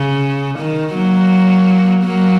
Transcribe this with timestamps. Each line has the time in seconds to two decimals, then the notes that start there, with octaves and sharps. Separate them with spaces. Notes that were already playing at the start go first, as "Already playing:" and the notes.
Already playing: C#3
0.59 D#3
0.94 F#3 A#3
2.04 F#3 A#3